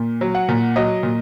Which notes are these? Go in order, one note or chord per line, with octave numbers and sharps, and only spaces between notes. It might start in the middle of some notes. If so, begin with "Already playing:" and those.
Already playing: A#2
F#3
F#5
A#2
F#3 D#5
A#2